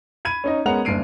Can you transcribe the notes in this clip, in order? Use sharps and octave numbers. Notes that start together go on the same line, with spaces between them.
B5 G#6 D#7
C#4 D#4 D#5
G#3 B3 C#4 A#4 F#5 F7
F#1 G2 D4 C7 D7 D#7